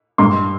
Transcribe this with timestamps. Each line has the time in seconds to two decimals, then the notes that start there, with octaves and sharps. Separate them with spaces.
0.18 G2 C6